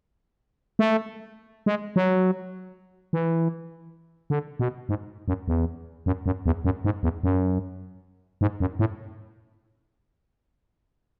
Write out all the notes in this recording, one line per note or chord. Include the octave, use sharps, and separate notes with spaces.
A3
G#3
F#3
E3
D3
B2
G#2
F#2
E2
F#2
F#2
E2
F#2
G#2
E2
F#2
G#2
F#2
A2